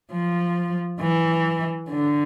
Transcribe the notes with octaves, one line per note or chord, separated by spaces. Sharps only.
F3
E3
D3